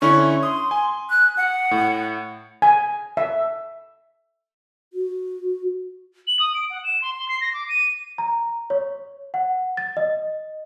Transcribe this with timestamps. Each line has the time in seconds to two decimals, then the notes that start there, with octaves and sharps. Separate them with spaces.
0.02 D3 C#4 E4 C#6
0.43 C6 D#6
0.71 G#5
1.10 F#6
1.37 F#5
1.71 A2
2.62 G#5
3.17 E5
4.93 F#4
6.27 F#7
6.39 D#6
6.55 D7
6.70 F#5
6.84 E7
7.02 C6
7.17 C6
7.29 C7
7.41 A#6
7.54 D6
7.69 D#7
8.18 A#5
8.70 C#5
9.34 F#5
9.77 A6
9.97 D#5